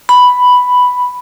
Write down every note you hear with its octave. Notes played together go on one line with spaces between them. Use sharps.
B5